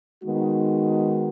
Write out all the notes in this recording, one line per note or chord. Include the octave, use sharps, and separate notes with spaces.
D#3 G#3 B3 D#4 F#4